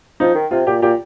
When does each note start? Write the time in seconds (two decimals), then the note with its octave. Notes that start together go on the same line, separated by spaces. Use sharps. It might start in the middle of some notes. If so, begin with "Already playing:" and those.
0.20 F3 D#4
0.35 D#3
0.51 C3 F4
0.67 A#2 G4
0.82 A#2 G4